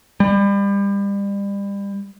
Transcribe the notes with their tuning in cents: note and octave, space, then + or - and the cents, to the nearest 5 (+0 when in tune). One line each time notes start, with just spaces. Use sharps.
G3 +30